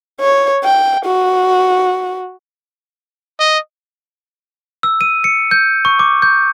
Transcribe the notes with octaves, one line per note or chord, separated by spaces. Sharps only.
C#5
G5
F#4
D#5
E6
D#7
C#7
G6
C#6
D6
G6